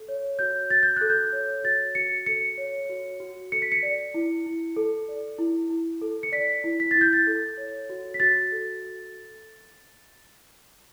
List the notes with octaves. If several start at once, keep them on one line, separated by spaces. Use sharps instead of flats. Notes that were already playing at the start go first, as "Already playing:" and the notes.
Already playing: A4
C#5
F#4 G6
F#4 A6
G6
A4 F#6
G6
C#5
F#4 A6
F#4 C#7
A4 C#7
C#5
F#4
F#4
A4 C#7
B6
C#7
D5
E4
E4
A4
D5
E4
E4
A4
C#7
D5 B6
E4
B6
E4 A6
G6
A6
A4
C#5
F#4
B6
F#4 A6
A4